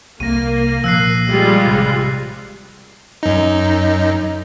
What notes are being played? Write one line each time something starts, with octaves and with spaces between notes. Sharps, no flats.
C2 A#3 A#6 D#7
A#2 F3 E6 F#6 C7
G3 G#3 F4
A1 C3
F#2 D#4